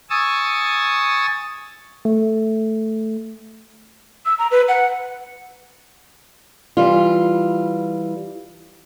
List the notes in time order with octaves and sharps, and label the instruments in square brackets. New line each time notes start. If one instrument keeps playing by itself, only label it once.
[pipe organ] G#5 C#6 D#6 E6 A6
[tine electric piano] A3
[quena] E6
A#5
B4
F#5
[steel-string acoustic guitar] E3 G3 F4